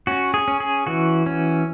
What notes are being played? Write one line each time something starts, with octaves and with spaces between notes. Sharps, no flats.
C#4 F#4
G#4
C#4
G#4
E3 F#4
C#4